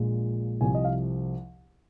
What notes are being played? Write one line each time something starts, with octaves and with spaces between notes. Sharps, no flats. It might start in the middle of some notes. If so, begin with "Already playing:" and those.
Already playing: A#1 A#2 G#3
C2 C3 F3 G#5
D#5
F5